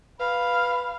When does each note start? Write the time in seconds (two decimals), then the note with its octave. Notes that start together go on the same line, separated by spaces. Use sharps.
0.20 B4 F5 B5